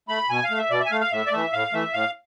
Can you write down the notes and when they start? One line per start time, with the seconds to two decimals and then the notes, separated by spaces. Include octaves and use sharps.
0.09 A3 B5
0.30 B2 G#5
0.44 F5
0.50 A3
0.58 E5
0.70 B2 D5
0.80 E5
0.86 G#5
0.91 A3 F5
1.01 F5
1.12 A2 E5
1.26 D5
1.32 E3 A3 E5
1.53 A2 F5
1.73 E3 A3 E5
1.94 A2 F5